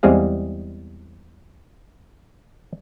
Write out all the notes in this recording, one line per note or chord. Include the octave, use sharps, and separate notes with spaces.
E2 G3 G#3 C4 G#4 F5